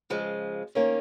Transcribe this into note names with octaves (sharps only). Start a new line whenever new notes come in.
C#3 F3 G#3
D#3 A#3 C#4